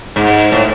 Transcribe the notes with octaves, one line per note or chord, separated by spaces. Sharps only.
G#2
A2